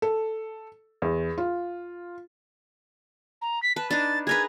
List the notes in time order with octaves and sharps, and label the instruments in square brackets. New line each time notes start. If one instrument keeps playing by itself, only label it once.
[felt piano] A4
E2
F4
[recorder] A#5
B6
[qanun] B4 [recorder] A5
[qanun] D4 D#4 [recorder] A6
[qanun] G#4 A#4 B4 [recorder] G#6